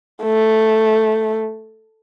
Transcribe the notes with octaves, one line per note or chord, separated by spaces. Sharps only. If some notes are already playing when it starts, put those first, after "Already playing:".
A3